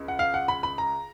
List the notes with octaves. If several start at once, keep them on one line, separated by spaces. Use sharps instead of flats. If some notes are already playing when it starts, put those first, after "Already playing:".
Already playing: C#2 C#3
F#5
F5
F#5
B5
B5
A#5